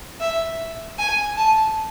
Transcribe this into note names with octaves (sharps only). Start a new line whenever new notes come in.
E5
G#5
A5